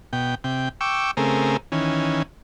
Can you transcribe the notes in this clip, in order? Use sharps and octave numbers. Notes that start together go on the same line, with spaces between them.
B2 G5
C3 G5
G5 C#6 D6 E6
C#3 A3 C4 G#4 A#4
D#3 E3 C#4